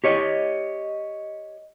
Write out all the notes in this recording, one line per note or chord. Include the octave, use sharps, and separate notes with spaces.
G4 C#5 D#5